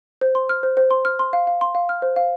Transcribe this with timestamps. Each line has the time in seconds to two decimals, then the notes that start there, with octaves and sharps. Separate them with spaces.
0.21 C5
0.35 C6
0.49 F6
0.63 C5
0.77 C5
0.91 C6
1.05 F6
1.19 C6
1.33 F5
1.47 F5
1.61 C6
1.75 F5
1.89 F6
2.02 C5
2.16 F5